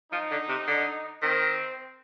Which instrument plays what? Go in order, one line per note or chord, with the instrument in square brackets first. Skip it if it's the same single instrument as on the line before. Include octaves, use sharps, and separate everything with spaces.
[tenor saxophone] F3 [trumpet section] D#4
[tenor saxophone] D3
C3
D3
[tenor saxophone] D#3 [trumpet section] C4